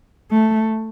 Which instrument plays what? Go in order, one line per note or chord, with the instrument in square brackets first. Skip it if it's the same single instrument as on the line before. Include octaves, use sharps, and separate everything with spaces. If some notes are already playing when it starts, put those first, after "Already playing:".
[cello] A3